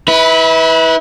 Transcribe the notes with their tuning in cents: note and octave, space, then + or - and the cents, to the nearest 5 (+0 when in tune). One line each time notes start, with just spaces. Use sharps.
E4 -30 B4 +0